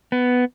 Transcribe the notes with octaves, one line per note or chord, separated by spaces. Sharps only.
B3